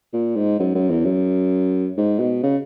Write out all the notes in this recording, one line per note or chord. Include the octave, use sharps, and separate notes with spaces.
A#2
G#2
F#2
F#2
E2
F#2
G#2
B2
C#3